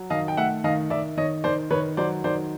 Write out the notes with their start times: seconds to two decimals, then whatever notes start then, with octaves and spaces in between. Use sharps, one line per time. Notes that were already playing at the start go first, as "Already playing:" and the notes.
Already playing: F#3
0.10 D#3 D#5 F5
0.28 G5
0.37 A3 E5 F#5
0.64 D#3 D#5 F5
0.90 D#3 D5 E5
1.17 D#3 C#5 D#5
1.44 D#3 C5 D5
1.70 D#3 B4 C#5
1.97 F#3 C5 D5
2.24 D#3 C5 D5